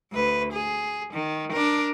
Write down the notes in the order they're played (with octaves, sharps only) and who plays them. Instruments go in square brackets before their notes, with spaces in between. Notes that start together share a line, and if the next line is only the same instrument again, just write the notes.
[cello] D2 B4
G#4
D#3
D4 A#4